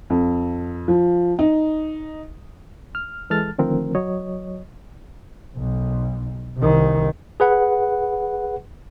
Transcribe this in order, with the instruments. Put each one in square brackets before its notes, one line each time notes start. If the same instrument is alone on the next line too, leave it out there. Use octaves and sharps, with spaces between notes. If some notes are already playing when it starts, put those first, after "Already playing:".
[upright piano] F2
F3
D#4
[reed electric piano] F6
E3 G#3 A4 A5 F6 A6
D3 D#3 F3 A3 C4 A#4
F#3 C#5 D#5
[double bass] B1
C2 D#3
[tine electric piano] G#4 B4 F#5